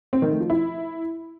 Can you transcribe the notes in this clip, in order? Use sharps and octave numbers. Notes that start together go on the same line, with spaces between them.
C4
D#3
A3
F3
E4